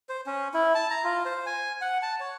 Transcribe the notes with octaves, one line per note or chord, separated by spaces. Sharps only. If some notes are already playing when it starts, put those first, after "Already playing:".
C5
C#4
E4
A5
A#5
F4
C5
G#5
F#5
A5
C#5